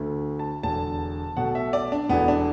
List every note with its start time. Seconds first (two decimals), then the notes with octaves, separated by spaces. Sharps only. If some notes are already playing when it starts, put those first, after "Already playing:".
Already playing: D2 D3 A3
0.39 A5
0.63 E1 E2 D3 A5
1.37 B1 B2 A3 F#5
1.55 E5
1.73 D5
1.92 D4
2.09 E1 E2 E3 A3 B3
2.28 D4